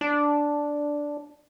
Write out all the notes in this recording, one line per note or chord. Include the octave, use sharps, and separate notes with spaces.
D4